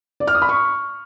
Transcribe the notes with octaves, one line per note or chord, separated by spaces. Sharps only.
D5
F6
D#6
B5
C#6